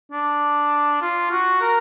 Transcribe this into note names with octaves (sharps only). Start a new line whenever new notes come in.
D4
F4
F#4
A#4